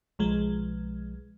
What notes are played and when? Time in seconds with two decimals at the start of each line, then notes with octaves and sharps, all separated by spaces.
0.19 B1 F3 G#3